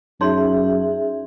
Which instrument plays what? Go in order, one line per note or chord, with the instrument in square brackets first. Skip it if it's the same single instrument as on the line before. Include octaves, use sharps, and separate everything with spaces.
[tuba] F#2 [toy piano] D#4 C#5 C6 [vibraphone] G#4 E5